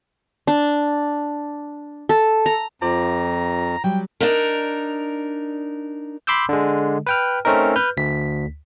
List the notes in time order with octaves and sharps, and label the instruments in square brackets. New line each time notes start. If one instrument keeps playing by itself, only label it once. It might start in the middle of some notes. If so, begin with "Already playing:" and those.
[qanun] D4
A4
A#5
[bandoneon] F2 [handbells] F4 C5 D6 [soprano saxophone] A#5
[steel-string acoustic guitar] F#3 G3 [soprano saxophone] G5
[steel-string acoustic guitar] D4 D#4 A#4
[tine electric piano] B5 C6 D6 E6 G6
D3 G#3
B4 G5 F6
A3 C4 C#4 D#4 A#4
B4 F6 G6
D2 B6